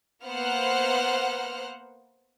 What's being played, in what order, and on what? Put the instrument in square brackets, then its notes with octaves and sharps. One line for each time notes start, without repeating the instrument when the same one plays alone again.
[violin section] A#3 B3 C5 F#5 F6 F#6